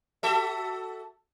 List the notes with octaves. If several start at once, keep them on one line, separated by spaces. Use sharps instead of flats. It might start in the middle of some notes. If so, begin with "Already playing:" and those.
F#4 A4 E5